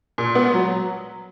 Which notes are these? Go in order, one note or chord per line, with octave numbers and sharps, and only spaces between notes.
A#2
B3
F#3